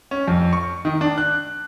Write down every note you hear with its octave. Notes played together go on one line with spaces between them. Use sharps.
C#4
F2
C#6
D#3
D4
F#6